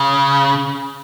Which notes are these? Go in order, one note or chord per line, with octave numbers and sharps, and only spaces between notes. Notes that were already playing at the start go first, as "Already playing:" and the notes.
Already playing: C#3